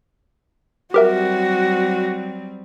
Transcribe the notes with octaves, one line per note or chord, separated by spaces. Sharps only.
F#3 G3 C4 F#4 G4 A#4 E5